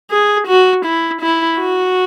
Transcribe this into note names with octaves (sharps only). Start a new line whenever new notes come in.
G#4
F#4
E4
E4
F#4